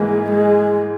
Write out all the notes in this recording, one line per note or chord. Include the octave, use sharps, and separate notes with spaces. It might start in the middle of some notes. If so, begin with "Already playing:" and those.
Already playing: G#2 E3 G#3 A#3
G#3